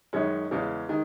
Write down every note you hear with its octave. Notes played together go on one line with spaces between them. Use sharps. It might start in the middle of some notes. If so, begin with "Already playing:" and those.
F#2 D#3 G#3 C#4
E2 C#3 G#3
D#3 G#3